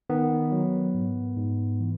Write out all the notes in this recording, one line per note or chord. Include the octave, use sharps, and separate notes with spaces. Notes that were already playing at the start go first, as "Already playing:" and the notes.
D#3 B3
F#3
G#2
G#2
E3